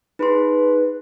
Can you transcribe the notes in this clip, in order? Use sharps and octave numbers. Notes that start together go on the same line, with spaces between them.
D#4 G#4 B4 C6